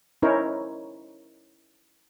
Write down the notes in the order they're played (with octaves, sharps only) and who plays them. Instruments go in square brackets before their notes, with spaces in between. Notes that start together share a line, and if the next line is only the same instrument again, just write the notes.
[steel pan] C#4 D#4 E4 A#4 C5 C#5